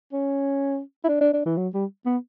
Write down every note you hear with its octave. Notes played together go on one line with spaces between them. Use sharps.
C#4
E4
D4
D4
D4
E3
F#3
G3
B3